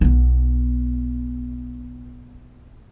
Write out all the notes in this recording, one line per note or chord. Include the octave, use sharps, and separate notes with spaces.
B1 B3